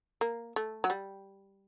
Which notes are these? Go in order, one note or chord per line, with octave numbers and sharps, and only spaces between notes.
A#3
A3
F#3
G3